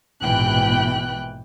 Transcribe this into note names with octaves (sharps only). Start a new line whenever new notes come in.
A#1 G#2 B2 E3 G5 F#6